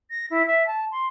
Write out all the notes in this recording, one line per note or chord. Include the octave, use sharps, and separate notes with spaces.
A#6
E4
E5
A5
C6